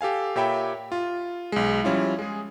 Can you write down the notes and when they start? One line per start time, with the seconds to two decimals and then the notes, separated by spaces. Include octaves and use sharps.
0.01 G4 A4 F5 G#5
0.36 A#2 G4 C#5 E5 G5 B5
0.92 F4
1.52 B1 G#3
1.84 F3 G3 C#4 E4 F4
2.19 G#3 G#4